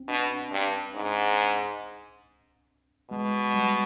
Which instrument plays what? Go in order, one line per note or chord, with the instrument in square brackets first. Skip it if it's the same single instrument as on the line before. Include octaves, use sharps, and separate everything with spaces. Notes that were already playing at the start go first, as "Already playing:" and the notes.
Already playing: [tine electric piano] C4
[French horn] B2 [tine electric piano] D4
[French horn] G2
G#2
[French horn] B2 [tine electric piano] G#3
[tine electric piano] G3